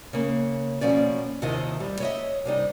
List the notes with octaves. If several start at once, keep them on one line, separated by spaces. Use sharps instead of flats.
C#3 A#3
B2 F3 A#3 C#4 D5
D#2 C3 D#3 E4 F4 D#5
G3
C#5 D#5 E5
C3 G3 D#4